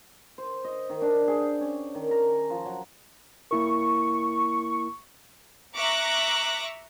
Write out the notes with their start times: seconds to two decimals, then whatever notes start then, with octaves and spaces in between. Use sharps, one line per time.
0.38 C5
0.65 D#5
0.90 D#3
1.02 D4
1.28 G#4
1.40 G5
1.61 C#4
1.95 D#3
2.11 A#5
2.50 F3
2.65 F#3
3.51 A#3 E4 A#4 C#6
5.74 E5 A#5 C#6 D6 F#6 A#6